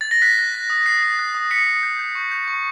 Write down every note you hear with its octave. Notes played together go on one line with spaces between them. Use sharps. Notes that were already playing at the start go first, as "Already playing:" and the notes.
A6
A#6
F#6 B6
F#6
F#6
D#6
F#6 C7
D#6
F#6
D#6
D#6 B6 C#7
D#6
G6
G6
C#6
G6
C#6